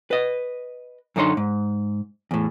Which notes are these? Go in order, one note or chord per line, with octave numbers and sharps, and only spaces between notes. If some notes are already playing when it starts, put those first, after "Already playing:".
B4 D#5
F#2 D3 D#4 C#5 C6
G#2
E2 A2